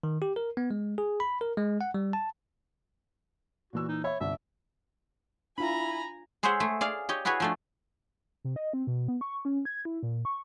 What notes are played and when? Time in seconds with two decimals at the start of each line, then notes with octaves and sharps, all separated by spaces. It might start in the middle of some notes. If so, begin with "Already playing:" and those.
0.03 D#3
0.22 G4
0.36 A#4
0.57 B3
0.71 G#3
0.98 G#4
1.20 B5
1.41 A#4
1.57 G#3
1.81 F#5
1.94 G3
2.13 A5
3.73 A#2 E3 F#4 E6
3.88 D#4
4.04 C#5 E5 B5
4.20 G1 C2 E5
5.58 D4 E4 F4 G#5 A#5 B5
6.43 G#3 G#4 C5 C#5 E5 F#5
6.60 A3 G#4
6.81 G#4 D5 F5
7.09 G4 C#5 D#5
7.25 E4 F#4 G#4 B4 C#5
7.40 F3 A3 D4
8.44 C3
8.56 D#5
8.73 C4
8.87 B2
9.08 B3
9.21 C#6
9.45 C#4
9.65 G#6
9.85 E4
10.03 A#2
10.25 C#6